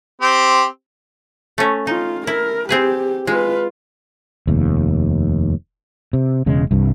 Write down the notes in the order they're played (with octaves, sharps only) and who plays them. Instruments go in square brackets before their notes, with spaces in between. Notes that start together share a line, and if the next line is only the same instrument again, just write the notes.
[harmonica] C4 G4
[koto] A3 C#4
[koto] D#4 [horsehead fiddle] F4
[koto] E4 [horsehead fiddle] A#4
[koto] C4 G#4 B4 [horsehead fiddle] G4
[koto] G#3 [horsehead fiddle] F4 B4
[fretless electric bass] F1 D#2
C3
E1 C#3 G#3
C2 G2